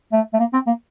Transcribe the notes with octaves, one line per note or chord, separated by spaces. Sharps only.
A3
A3
A#3
C4
A#3